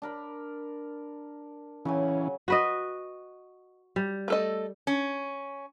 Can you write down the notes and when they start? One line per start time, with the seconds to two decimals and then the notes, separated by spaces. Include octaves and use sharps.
0.02 D4 A#4 B5
1.85 C#3 E3 F#3 C#4 G#5
2.48 F#4 B4 D#5
3.96 G3
4.28 A3 A4 D#5
4.87 C#4